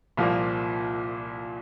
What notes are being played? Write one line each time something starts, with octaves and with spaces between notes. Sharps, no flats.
C2 A#2 F3 A#3